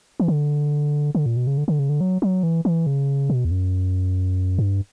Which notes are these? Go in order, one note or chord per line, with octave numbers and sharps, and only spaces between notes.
E3
D3
D3
A#2
B2
C#3
D3
D3
C#3
D3
F#3
F#3
E3
E3
C#3
B2
E2
F#2
G2